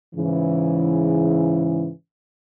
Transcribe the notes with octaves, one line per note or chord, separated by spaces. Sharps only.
G#2 C#3 E3